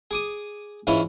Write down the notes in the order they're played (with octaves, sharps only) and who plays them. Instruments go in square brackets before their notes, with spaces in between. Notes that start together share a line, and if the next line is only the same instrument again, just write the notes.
[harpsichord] G#4 D6 D#6
G#2 E3 C#4 E4 F4